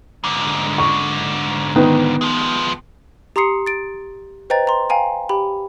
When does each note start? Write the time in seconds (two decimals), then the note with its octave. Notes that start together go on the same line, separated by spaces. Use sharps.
0.24 G#2 D3
0.78 C#6
1.76 D#3 B3
2.21 F3 G#3
3.36 G4 A#5 C6 D#6 C7 C#7
3.66 A6 D7
4.50 B4 C5 D#5 G5 A#5 A6
4.67 A#5 C6
4.90 F5 G5 G#5 A#5
5.29 G4 G5 B5